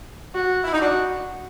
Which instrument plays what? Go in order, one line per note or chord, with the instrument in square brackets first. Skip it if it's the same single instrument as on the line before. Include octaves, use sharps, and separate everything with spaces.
[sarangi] F#4
[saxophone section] E4
D#4
[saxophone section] D4 [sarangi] F#4